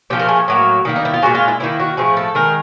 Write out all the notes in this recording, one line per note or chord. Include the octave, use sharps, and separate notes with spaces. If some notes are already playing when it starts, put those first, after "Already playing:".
A#2 F3 A3 G4
A#4
G#4
A2 F#3 A#3
D#3 G3 A#3
D#4
E4
F4
A#2 F3 G#3 F#4
F4
E4
D#3 F#3 A#3 E4
F#4
A2 F3 A3 G#4
A4
D#3 G#3 A#4